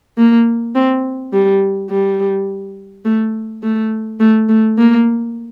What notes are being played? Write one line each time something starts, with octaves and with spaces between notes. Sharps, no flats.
A#3
C4
G3
G3
A3
A3
A3
A3
A#3